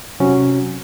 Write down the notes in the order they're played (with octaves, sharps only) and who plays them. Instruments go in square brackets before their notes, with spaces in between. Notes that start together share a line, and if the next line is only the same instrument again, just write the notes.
[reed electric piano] C3 F#3 C#4 F#4